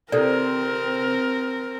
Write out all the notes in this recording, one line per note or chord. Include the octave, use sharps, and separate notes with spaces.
C3 C4 E4 A4 A#4 D5